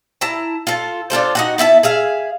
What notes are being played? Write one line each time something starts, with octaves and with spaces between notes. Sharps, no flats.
E4 A5 A#5
F4 A4
D4 F4 A4 C5
D#4 F#4 F#5
B3 E4 E5 A5
G#4 E5 F5